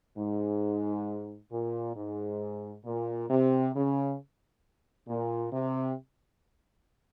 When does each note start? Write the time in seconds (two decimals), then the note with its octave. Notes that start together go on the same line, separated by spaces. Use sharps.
0.18 G#2
1.52 A#2
1.96 G#2
2.85 A#2
3.30 C3
3.75 C#3
5.08 A#2
5.52 C3